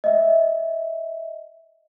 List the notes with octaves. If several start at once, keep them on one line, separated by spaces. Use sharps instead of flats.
D#5 E5